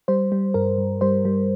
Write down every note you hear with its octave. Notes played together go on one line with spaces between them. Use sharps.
G3 C5
G3
G2 A#4
G2
G3 C5
G3